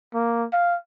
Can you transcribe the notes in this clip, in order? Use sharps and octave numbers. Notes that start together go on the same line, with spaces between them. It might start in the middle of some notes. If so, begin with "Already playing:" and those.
A#3
F5